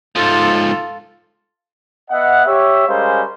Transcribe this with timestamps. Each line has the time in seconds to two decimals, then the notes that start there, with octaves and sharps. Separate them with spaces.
0.16 G#2 F3 F4 A4
2.11 B3 D#5 E5 F#5
2.46 G4 C#5 E5
2.88 G3 G#3 C#4 A#4 C5 F5